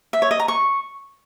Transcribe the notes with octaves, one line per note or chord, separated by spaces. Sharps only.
E5
C#5
D#5
A#5
C#6